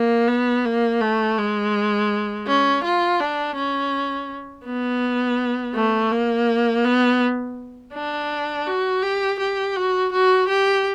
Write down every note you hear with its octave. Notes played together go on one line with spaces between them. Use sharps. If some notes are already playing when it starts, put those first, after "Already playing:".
Already playing: A#3
B3
A#3
A3
G#3
C#4
F4
D4
C#4
B3
A3
A#3
B3
D4
F#4
G4
G4
F#4
F#4
G4